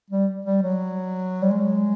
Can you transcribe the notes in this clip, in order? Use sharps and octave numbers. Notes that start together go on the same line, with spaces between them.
G3
G3
F#3
G3
G#3